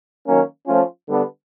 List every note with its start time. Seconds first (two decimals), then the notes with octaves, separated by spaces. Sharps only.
0.26 D#3 F#3 A#3 C#4
0.66 F3 A3 C#4 F4
1.07 D3 G3 B3 D4